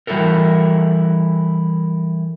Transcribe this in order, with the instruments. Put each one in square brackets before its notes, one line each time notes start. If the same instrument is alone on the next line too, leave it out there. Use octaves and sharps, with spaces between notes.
[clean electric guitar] E3 G3 E4 F#4 A4 A#4